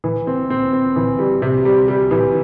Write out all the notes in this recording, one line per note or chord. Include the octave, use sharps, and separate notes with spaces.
E3
C4
C4
C4
E3
G3
C3
G3
G3
E3